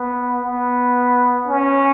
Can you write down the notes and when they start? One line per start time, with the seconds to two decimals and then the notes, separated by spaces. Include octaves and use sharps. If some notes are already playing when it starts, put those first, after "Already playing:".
Already playing: B3
0.43 B3
1.47 C#4